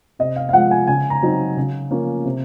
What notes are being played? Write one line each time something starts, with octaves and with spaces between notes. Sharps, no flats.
C3 D#5
F5
F5
F3 G#3 F#5
G#5
C#3 G#5
A#5
F#3 C4 D#4
C#3
F3 A#3 C#4
C3